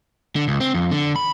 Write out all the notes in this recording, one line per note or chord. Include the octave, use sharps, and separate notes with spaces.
D3
C#2
C4
F2
D3
B5